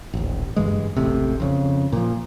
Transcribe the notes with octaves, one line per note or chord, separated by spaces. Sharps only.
D#1 A1
F#1 G2 E3 G#3
E1 A1 A2 C3
F2 C#3
A#2 F3